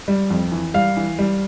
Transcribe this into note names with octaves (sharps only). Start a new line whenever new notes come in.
G3
F2
E3
G3 F5
E3
G3